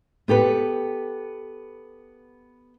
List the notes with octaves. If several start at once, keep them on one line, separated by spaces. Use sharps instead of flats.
B3 G4 A4 B4